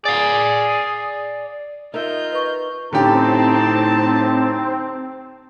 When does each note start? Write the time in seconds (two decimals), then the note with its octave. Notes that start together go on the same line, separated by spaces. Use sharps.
0.05 G#4 D5 F5
1.94 D#4 F4 A#4 D#5 E5 G6
2.32 B4 C#6
2.93 A2 D3 C4 C#4 D#4 G4 A5